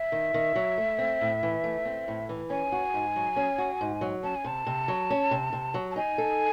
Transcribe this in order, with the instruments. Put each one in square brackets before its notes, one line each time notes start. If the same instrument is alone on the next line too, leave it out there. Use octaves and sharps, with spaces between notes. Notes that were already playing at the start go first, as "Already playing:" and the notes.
Already playing: [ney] E5
[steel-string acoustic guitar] D#3
D#3
F#3
A3
C4
A2
E3
A3
C4
A2
E3
[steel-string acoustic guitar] C#4 [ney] G#5
[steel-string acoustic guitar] F#4
G#2
F#3
C#4
F#4
G#2
F#3
[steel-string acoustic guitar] C#4 [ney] A5
[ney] G#5
[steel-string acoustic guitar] C3 [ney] A5
[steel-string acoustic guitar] C3
F#3
C#4
C3
C3
F#3
[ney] A5
[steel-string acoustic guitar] D#4 [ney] G#5
[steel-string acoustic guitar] A4